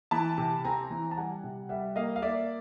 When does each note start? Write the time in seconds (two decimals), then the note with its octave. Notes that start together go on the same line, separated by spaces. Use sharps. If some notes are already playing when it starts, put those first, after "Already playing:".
0.11 E3 A5 B5
0.38 C3
0.64 C4 G#5 A#5
0.90 E3
1.11 A5
1.17 G3 F#5 G#5
1.44 C3
1.69 G3 E5 F#5
1.96 A#3 D#5 F5
2.16 F5
2.22 A#3 D5 E5